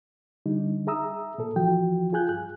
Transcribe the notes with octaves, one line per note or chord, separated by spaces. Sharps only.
D3 G3 D#4
G#4 E5 A#5 D#6 E6
A#2 A4
C#2 E3 F3 F#4 G5
F4 G#4 G#5 F#6 G6
G2 F#6